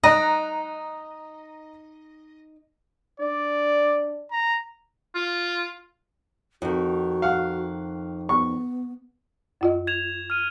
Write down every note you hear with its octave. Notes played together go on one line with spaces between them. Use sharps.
D#4 D#5 A#5 F#6 D7
D4 D5
A#5
F4
F2 D#3 F#4
F5 F#5
B3 C#6
F#2 F4 D#5
G#6 E7 F7
F6 D#7